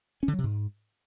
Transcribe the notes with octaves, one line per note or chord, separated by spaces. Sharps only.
C#4
D3
F#3
C3
G#2